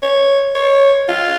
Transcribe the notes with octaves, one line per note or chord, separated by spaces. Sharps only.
C#5
C#5
F4